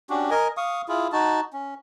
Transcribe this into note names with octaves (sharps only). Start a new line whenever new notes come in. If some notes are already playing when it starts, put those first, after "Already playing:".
C#4 D4 F#4 G4
A#4 D#5 G#5
F5 C#6 D#6
E4 F4 G#4
D#4 F#4 A5
C#4